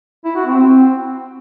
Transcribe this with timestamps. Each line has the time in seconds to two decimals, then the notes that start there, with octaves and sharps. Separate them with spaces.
0.25 E4
0.35 F#4
0.46 C4